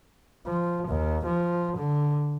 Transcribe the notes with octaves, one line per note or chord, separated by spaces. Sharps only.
F3
D#2
F3
D3